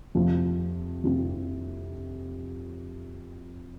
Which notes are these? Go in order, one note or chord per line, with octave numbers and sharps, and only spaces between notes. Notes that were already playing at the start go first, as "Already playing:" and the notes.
F2 C3 F3 C4
F2 C3 F3 C4